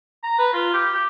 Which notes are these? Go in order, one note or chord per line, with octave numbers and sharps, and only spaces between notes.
A#5
B4
F4
G4
G4